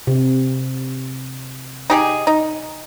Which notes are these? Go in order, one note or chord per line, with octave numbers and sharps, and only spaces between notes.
C3
D#4 G4 G#4
D#4